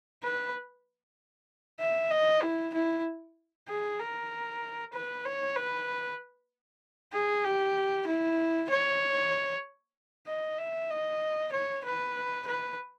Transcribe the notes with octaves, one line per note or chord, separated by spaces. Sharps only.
B4
E5
D#5
E4
E4
G#4
A#4
B4
C#5
B4
G#4
G4
E4
C#5
D#5
E5
D#5
C#5
B4
B4